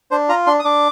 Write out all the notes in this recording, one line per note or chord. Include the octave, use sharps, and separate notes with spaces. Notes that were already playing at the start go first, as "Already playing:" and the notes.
D4 C5
F4 A#5
D4 C6
D#6
D4 D6